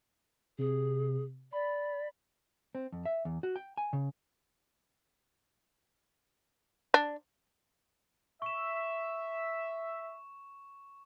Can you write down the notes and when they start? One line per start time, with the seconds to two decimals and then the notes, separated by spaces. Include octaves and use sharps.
0.59 C3 G#4
1.53 D5 B5
2.75 C4
2.92 F2
3.06 E5
3.25 E2
3.43 F#4
3.56 G5
3.77 G#5
3.93 C#3
6.94 D4
8.42 E5 C#6 E7